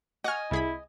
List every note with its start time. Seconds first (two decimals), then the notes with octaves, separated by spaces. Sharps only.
0.24 D#5 F#5 G#5 C#6 F6
0.51 C2 E4 G#4 B5